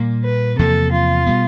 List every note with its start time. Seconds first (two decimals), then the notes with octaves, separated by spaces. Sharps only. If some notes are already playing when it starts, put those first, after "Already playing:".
Already playing: A#2 G3 A#3
0.24 B4
0.58 E2 C3 F3 A#3 A4
0.92 F4
1.26 B2 G3 B3